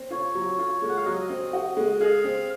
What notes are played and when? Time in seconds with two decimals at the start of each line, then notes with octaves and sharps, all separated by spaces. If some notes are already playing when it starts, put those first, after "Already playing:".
Already playing: C4
0.11 F4 C#5
0.35 F#3
0.59 F4
0.82 G#3
0.89 F#5
0.97 F5
1.06 F#3 D#5
1.29 C4
1.53 F#4
1.77 G#3
2.00 G#4 F5
2.24 C4